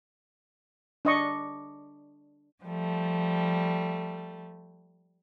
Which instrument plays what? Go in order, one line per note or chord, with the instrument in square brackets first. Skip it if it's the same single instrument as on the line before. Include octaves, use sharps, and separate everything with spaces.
[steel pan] D4 D#5 C#6
[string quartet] F3 G3 A3